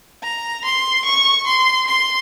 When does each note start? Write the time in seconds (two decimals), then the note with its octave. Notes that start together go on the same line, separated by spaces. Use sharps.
0.23 A#5
0.65 C6
1.05 C#6
1.47 C6
1.88 C6